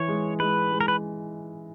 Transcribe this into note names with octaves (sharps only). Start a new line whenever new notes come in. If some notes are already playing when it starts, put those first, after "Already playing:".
Already playing: E3 C#5
G#3
G#3 B4
G#3
A#4
B4